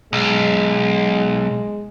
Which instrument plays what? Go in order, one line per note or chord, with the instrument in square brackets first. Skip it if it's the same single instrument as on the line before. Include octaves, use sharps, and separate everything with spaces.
[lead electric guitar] B1 [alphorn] G#3